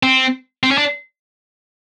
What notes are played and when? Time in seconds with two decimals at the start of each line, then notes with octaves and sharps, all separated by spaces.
0.03 C4
0.63 C4
0.71 C#4
0.78 D4